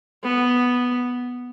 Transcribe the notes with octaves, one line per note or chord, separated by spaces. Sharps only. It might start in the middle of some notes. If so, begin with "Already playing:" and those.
B3